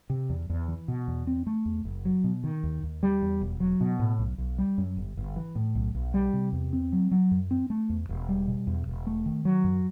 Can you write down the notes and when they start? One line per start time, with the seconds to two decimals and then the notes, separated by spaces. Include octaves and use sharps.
0.10 C3
0.30 E2
0.50 E2
0.68 E3
0.88 B2
1.08 E2
1.27 C4
1.47 A3
1.65 E2
1.85 F#1
2.05 F#3
2.24 B2
2.44 D#3
2.63 D#2
2.83 D#2
3.03 G3
3.22 E2
3.41 E1
3.60 F#3
3.81 B2
3.99 A2
4.19 B1
4.38 B1
4.58 G3
4.78 F#2
4.97 G1
5.17 G1
5.36 E3
5.55 A2
5.75 B1
5.95 B1
6.14 G3
6.33 C3
6.53 E2
6.73 C4
6.93 F#3
7.11 F#3
7.31 F#2
7.51 C4
7.70 A3
7.89 E2
8.09 E1
8.29 G3
8.48 B2
8.67 E2
8.87 E1
9.07 A3
9.26 D#3
9.45 F#3
9.64 F#2